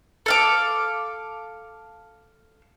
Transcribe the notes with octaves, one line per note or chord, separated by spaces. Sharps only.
A4 F5 D6